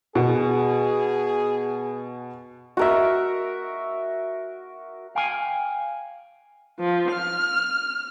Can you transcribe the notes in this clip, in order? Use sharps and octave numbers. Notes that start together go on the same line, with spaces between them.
B2 G#4
F#4 A#4 E5
F5 G5 G#5
F3
F6